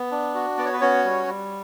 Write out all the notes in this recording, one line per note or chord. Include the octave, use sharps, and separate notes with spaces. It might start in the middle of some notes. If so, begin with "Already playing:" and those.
Already playing: B3
D4
F#4
B3 D5
C#5
B4
C#4 F#4 C#5
G3
G3